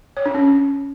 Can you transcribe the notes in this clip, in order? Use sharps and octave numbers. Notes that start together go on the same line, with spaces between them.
C#5
D4
C#4